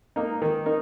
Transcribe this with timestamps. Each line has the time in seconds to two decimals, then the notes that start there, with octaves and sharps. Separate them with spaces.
0.16 A#3 D#4 A#4
0.42 D#3
0.66 D#4 A#4